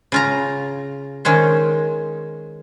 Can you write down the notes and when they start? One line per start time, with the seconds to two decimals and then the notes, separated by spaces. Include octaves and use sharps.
0.12 C#3 F4 A#5
1.25 D#3 G#3 C#4 C5